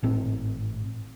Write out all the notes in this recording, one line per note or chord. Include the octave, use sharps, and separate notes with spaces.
G#1 A2 C4